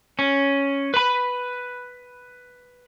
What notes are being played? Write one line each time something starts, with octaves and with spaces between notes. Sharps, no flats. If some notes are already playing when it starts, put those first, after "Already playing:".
C#4
B4 B5